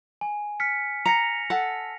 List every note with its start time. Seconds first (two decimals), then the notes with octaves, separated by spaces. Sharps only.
0.21 G#5
0.60 F6 B6 C#7
1.06 A#5 A#6 C#7 F7
1.50 A4 F#5